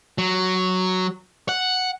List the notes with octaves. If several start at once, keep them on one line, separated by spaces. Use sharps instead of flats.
F#3
F#5